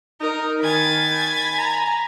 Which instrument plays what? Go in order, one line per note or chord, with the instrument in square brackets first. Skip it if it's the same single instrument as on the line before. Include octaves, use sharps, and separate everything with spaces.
[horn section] D#4 [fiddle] A#4
[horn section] D#3 [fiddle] G#5 B5 [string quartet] G#6 A6
[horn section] A#5